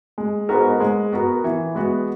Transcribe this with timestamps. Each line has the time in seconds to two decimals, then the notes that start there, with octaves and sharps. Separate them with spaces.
0.18 G#3
0.48 G#2 B3 F#4 A#4
0.80 G#3
1.12 B3 F#4 A#4
1.44 E3
1.75 G#3 B3 F#4